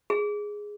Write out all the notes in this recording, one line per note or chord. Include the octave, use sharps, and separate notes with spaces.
G#4